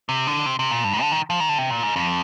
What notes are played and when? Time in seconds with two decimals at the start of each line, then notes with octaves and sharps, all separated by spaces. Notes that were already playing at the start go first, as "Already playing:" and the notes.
0.09 C3
0.27 D3
0.46 C3
0.59 C3
0.71 A#2
0.84 G2
0.93 G#2
1.02 D3
1.12 D#3
1.30 F3
1.40 D#3
1.49 D3
1.58 C3
1.70 A#2
1.83 G#2
1.96 F2